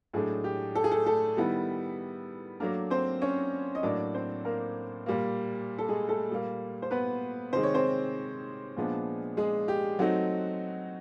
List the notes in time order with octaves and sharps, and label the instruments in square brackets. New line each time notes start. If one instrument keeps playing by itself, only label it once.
[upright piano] A2 F#3 G#3 A3 D4 G#4
G4
A4
G#4
A3 A4
A3 A4
D#3 G3 B3 E4
F#3 A3 A#3 D4 A#4
C4 C5
C#4 C#5
D#5
A2 F#3 A#3 D4 D5
C4 C5
A#3 A#4
A#2 G3 A#3
A4
G#3 G#4
A3 A4
A#2 G3 A#3
C5
B3 B4
C3 D#3 G#3 C5
C#5
C4 C5
A#2 F3 G#3 B3 D4
G#3 G#4
G4
F#3 A3 C4 D#4 F#4